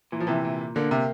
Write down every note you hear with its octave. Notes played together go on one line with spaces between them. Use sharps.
A#2 E3
F3
C3 E3
A#2
D3 A#3
C3